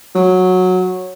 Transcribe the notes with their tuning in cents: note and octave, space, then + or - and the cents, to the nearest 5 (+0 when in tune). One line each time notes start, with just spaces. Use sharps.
F#3 -10